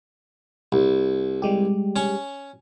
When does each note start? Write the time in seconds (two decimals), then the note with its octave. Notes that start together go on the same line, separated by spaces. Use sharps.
0.72 C2
1.42 G3 G#3 G4
1.96 C#4 C#6